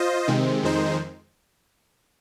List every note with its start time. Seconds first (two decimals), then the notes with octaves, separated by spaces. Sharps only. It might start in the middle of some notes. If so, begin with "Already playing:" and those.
Already playing: F4 C5 D#5
0.28 C3 D#3 G#3 C4
0.63 F2 D#3 G#3 D#4 C5